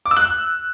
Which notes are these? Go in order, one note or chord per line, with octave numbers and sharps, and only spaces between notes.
D6
E6
F#6